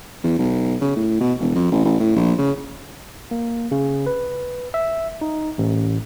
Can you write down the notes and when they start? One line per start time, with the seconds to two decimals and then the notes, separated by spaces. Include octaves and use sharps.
0.23 E2
0.39 B1
0.81 C#3
0.96 A2
1.20 B2
1.40 E1
1.55 F2
1.71 A1
1.85 A1
2.00 A2
2.16 A#1
2.38 C#3
3.31 A#3
3.71 C#3
4.06 B4
4.74 E5
5.21 D#4
5.58 A1